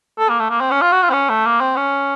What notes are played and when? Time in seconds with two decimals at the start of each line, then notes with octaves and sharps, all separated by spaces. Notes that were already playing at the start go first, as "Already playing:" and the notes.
0.18 A4
0.29 A#3
0.40 A3
0.50 A#3
0.60 C4
0.71 C#4
0.81 F4
0.92 F#4
1.02 F4
1.09 C4
1.13 C#4
1.29 A3
1.46 A#3
1.60 C4
1.76 C#4